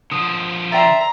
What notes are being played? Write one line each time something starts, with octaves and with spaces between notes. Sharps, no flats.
D3 F3 D#6
D5 E5 G5 A#5 C6